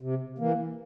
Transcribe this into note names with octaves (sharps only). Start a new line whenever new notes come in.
C3
E3 A#3